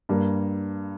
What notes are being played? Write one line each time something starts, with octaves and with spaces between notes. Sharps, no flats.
G2 G3 A#3